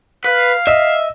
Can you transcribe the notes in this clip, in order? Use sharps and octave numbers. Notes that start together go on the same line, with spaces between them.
B4 F5
D#5 E5